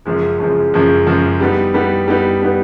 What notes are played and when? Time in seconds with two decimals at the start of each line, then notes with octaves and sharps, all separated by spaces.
0.05 F#2 C#3 F3 G#3
0.39 F#2 C#3 F3 G#3
0.74 F#2 C#3 F3 G#3
1.07 F#2 C#3 F3 G#3
1.40 G3 B3 D#4
1.74 G3 B3 D#4
2.08 G3 B3 D#4
2.42 G3 B3 D#4